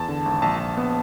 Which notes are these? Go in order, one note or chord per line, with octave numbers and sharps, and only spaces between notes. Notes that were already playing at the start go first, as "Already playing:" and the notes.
Already playing: E2 A5
D3
G#1
A#1 A5
A#1
B3